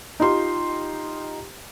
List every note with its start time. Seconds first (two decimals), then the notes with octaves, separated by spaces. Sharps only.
0.20 D#4 F4 G4 C6